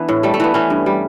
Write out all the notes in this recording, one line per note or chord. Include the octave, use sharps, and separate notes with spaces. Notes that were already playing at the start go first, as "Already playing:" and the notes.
Already playing: E3 B3 D4
A2
G3 A3
A3
E3 B3
E3 C#4
G2
G3